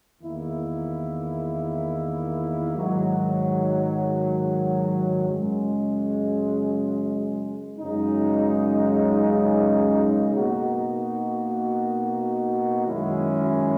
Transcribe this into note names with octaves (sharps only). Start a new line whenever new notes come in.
E2 D#3 A#3 E4
G#2 D#3 F#3
F#2 C#3 G#3
F#2 C#3 G#3 D#4
B2 A#3 D#4 F#4
F#2 D#3 G#3 C#4 E4